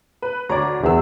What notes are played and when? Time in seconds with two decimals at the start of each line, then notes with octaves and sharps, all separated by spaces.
0.22 B4
0.49 D2 C#5 D5 A#5
0.84 E2 D#3 E6